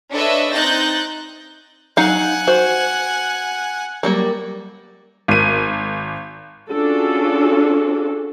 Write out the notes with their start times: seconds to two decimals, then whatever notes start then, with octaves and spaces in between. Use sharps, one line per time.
0.11 D4 A4 B4 C#5 D#5 E5
0.51 C4 D#4 F#6 G6 A6 A#6
1.97 F#3 D#4 F5 F#5 G#5
2.47 F#4 C5
4.03 F#3 G3 A#3
5.28 G#1 D#7
6.71 C#4 D4 F4 F#4 G#4 A4